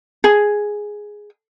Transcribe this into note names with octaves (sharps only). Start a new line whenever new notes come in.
G#4